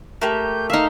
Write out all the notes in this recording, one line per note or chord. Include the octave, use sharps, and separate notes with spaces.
A3 A#3 G4 G6
D#4 E5 F5